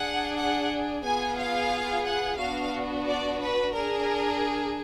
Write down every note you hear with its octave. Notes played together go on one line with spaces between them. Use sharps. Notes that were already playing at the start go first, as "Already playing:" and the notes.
Already playing: D4 G#4 F#5
F#5
B3 F4 G#4 G#5
F5
F#5
B3 D4 F#4 F5
D5
B4
D4 G#4 A#4